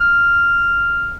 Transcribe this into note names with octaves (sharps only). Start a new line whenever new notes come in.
F6